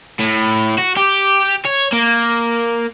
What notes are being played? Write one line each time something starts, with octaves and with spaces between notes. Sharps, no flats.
A2
F#4
G4
C#5
A#3